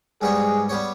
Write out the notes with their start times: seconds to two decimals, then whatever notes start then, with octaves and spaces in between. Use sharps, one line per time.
0.21 G#2 G3 B3 G4 G#4 C#5
0.69 G3 B3 G4 C#5